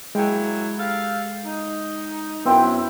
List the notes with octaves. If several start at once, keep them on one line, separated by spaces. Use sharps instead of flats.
F#3 G#3 A#3 E4 G5
G4 A4 F5
D#4
F#2 B3 C4 E4 G5